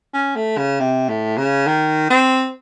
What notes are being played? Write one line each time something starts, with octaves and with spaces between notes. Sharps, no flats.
C#4
A3
C#3
C3
A2
C#3
D#3
C4